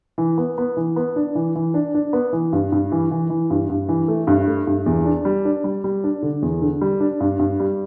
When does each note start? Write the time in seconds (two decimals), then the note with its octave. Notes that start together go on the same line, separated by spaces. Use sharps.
0.18 E3
0.38 B3
0.58 B3
0.77 E3
0.96 B3
1.16 D4
1.35 E3
1.55 E3
1.74 D4
1.94 D4
2.13 B3
2.33 E3
2.53 G2
2.72 G2
2.92 E3
3.11 E3
3.30 E3
3.50 G2
3.69 G2
3.88 E3
4.08 A3
4.27 G2
4.47 A3
4.67 G2
4.86 E2
5.05 D4
5.25 G3
5.45 D4
5.64 G3
5.84 G3
6.04 D4
6.22 D3
6.42 E2
6.62 D3
6.81 G3
7.00 D4
7.20 G2
7.39 G2
7.60 G3